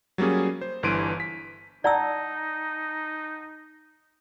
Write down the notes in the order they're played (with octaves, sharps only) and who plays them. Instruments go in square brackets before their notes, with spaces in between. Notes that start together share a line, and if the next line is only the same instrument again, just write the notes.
[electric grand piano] F#3 G3 A#3 C#4 G#4
C5
G1 G2 E3 C6 D7 D#7
B6
[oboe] D#4 [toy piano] D5 E6 [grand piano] F#5 A5 A#5